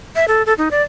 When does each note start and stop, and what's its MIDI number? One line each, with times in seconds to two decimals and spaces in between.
0.15 0.25 76
0.28 0.43 69
0.46 0.53 69
0.58 0.68 63
0.71 0.82 74